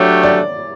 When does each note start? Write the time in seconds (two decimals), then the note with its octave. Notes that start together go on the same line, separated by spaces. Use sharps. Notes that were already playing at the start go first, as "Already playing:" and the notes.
Already playing: F#3 A3 D4 G4 C#5
0.23 D5